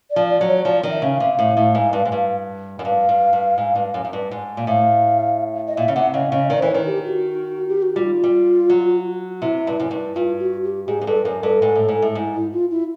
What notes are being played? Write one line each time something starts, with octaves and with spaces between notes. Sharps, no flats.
D5
F3
D5
F#3
C#5
F3 D5
D#3
E5
C#3
F5
C3
A2
A2
G#2
G2
G#2
G2
F#2
G2 F5
G2
G2
G#2
G2
F#2
F#2
G2
G#2
A#2
A2 F5
D#5
A#2 E5
C#3
C3 F#5
C#3 D#5
C#3 D#5
D#3 D5
E3 C5
C#5
D#3
G4
F#4
G4
F#4
G3 F4
G3
F#3
C3 E4
G2
F#2
G2
G2 F4
F#4
G4
G#2 G#4
F#2
G2 A4
F#2 A#4
G2 A4
G#2
A2
G#2
A2
G#2
E4
F4
E4